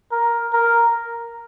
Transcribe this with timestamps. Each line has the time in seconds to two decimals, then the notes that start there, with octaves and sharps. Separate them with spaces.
0.12 A#4
0.53 A#4